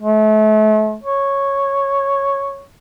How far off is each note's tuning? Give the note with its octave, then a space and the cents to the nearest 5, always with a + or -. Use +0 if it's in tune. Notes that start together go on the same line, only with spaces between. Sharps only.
A3 -35
C#5 -5